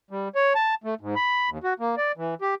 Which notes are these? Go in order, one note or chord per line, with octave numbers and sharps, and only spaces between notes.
G3
C#5
A5
A3
G#2
B5
D#2
F#4
A#3
D5
E3
G4